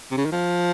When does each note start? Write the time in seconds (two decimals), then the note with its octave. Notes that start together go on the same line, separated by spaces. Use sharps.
0.11 C3
0.18 C#3
0.25 D#3
0.32 F3